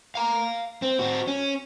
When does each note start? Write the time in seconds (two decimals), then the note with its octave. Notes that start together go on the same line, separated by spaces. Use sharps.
0.15 F5 A#5
0.82 C4
0.99 C4 F#4
1.27 C#4